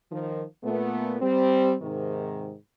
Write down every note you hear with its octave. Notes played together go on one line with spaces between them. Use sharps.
D#3 F3
A#2 A3 B3
G3 C4
G#2 C3 D#3